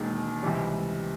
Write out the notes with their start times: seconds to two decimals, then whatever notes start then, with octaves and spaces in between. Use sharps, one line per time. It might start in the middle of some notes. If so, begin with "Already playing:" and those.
Already playing: E1 D#2 D#3 G#3
0.43 C#2 C3 E3 G3